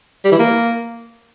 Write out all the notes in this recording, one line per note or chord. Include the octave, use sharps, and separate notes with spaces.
G3
E3
A#3